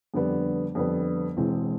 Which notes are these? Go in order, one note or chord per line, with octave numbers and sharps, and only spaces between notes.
F2 D3 G3 B3
F2 D3 G3 B3
E1 E2 B2 G#3 C4